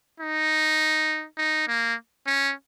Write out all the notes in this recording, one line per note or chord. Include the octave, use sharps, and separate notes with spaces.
D#4
D#4
A#3
C#4